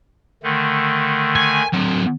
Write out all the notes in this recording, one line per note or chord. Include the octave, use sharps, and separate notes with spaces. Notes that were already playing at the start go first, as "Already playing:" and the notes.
D3 D#3 A3
G#5
F#3 C4